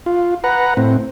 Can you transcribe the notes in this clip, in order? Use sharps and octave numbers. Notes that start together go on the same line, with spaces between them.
F4
B4 F#5 A#5
A2 C4